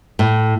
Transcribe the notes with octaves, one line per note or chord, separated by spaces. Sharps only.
A2